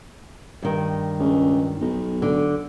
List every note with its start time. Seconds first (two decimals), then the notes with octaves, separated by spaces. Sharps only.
0.62 G2 D#3
1.19 C#2
1.81 B1 D#4
2.22 D3